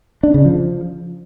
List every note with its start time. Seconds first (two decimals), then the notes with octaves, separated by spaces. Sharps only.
0.23 D4
0.34 C#3
0.45 F3